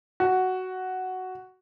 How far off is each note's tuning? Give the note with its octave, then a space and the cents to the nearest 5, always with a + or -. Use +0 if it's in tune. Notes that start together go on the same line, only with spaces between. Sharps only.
F#4 +5